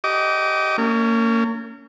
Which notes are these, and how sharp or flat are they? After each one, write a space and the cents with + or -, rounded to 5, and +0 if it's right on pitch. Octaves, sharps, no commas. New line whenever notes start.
G4 -20 D#5 +5 D6 -30
A#3 -30 C#4 +20